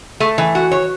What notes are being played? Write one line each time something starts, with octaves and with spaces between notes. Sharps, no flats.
A3
E3
F#4
C#5